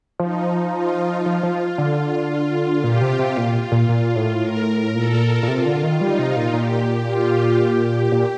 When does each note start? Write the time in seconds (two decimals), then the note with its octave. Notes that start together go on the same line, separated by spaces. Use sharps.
0.20 F3 D#4
0.73 F4
1.26 F3
1.43 F3
1.78 D3
2.31 F4
2.83 A#2 G4
3.01 C3
3.19 C3
3.36 A#2 F4
3.72 A#2
3.89 A#2
4.16 A2
4.42 A#4
4.95 A#2 A4
5.43 A#2
5.48 C3 F4
5.65 D3
5.83 D#3
6.01 G3 D#4
6.19 C3
6.36 A#2
6.54 A#2 G4
7.06 F4
7.59 G4
8.12 A#2